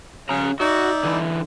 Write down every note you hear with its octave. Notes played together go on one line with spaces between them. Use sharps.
C#3 C#4 A#5
D#4 F#4 D5 E5
D3 E3